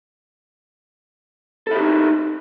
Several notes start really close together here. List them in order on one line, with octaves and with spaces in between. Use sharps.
A4 E4 G4 D#4